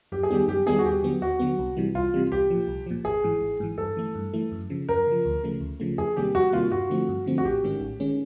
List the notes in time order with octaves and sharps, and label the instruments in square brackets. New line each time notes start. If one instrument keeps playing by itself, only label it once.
[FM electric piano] F#2 [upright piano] G4
[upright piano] G#4
[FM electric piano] D#3 G3 B3 D#4 [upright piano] G4
[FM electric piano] F#2 [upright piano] G4
[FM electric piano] D#3 G3 B3 D#4 [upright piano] G#4
[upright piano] F#4
[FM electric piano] D#2 [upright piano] G4
[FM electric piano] D3 F#3 B3
[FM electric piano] D#2 [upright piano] F#4
[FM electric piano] D3 F#3 B3
C2
C3 E3 G3
[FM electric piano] C2 [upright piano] F4
[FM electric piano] C3 E3 G3
[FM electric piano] C2 [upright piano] G4
[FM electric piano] A#2 F3
C2
A#2 F3
[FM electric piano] G#1 [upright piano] G#4
[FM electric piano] G#2 E3
G#1
G#2 E3
[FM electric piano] G2 [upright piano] A4
[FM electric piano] E3 A3
G2
E3 A3
F#2
C#3 F3
[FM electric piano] F#2 [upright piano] A#4
[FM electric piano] C#3 F3
D2
C#3 F3 A3
D2
C#3 F3 A3
[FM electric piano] F2 [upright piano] G#4
[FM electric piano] C3 D#3 G3 A#3 [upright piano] G4
[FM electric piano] F2 [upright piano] F#4
[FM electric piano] C3 D#3 G3 A#3 [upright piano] F4
[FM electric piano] G2 [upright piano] F#4
[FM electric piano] D3 F3 A3 C4
G2
D3 F3 A3 C4
[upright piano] F#4
[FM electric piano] A1 [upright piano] G4
[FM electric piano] G#2 D#3 G#3 C#4
A1
D#3 G#3 C#4